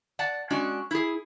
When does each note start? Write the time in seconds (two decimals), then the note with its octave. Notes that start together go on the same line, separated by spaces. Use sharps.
0.19 D5 F#5 A5
0.50 G#3 C#4 D4 F#4
0.91 E4 G#4